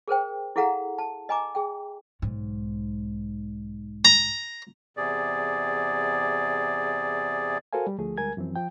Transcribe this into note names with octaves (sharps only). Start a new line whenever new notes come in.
G#4 A#4 C5 G5
E4 G#4 A4 F5 F#5 A#5
A5
D#5 G#5 A#5 D6
G#4 G5
B1 G#2
A#5
E2 C3 G#4 D5
F#4 A4 A#4 C5 F5 G#5
G3
D2 F3 A3 G#4
D2 G3 G#3 A#4 G#5 G#6
F#2 E3 F3 C4
F3 G5